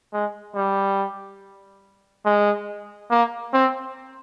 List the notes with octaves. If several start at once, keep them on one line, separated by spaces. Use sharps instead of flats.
G#3
G3
G#3
A#3
C4